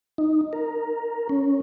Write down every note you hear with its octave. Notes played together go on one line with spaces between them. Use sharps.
D#4
A#4
C#4